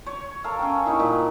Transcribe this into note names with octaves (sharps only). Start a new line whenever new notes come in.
C#5
A4 A#4 F5
C#4 G5
A#3 D#4 E4
A#2